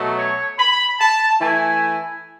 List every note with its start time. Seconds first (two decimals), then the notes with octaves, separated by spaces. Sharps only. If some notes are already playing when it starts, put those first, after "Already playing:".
Already playing: B2 F#3 A3
0.17 C#5
0.58 B5
0.99 A5
1.40 E3 A3 E4 G#5